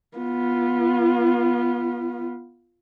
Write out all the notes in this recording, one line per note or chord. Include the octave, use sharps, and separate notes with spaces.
B3 F4